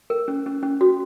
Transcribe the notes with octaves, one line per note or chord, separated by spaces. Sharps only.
A#4
C#4
C#4
C#4
F#4